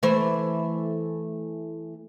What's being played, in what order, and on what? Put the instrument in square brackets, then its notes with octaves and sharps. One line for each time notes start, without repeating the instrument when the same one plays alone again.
[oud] E3 A3 C5